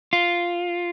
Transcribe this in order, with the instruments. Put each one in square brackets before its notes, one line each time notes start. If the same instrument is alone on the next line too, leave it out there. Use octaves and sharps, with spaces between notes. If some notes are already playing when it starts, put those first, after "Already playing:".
[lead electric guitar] F4